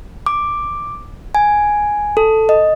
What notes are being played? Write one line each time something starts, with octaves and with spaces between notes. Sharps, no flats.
D6
G#5
A4
D#5